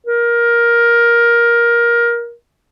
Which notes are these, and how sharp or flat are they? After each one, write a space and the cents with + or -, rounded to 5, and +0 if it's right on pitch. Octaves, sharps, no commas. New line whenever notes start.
A#4 +15